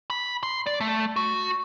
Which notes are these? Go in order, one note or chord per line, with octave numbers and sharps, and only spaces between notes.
B5
C6
D5
A3
F#4